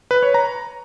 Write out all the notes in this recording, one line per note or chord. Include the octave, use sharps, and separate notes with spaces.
B4
C#5
A#5